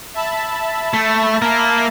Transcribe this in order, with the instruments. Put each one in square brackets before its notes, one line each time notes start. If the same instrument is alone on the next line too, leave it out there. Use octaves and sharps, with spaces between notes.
[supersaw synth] E5 A5 B5
[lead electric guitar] A3
A#3 A#4